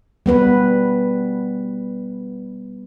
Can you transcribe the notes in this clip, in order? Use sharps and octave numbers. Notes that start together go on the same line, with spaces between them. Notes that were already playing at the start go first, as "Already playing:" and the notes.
G3 B3 B4